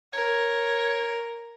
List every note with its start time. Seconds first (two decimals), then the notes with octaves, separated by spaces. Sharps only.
0.14 A#4 C#5